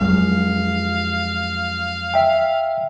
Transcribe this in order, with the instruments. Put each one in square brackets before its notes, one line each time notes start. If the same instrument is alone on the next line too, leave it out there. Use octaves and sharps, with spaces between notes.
[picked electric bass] F2 F#3 G#3 [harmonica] F5
[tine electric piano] E5 G5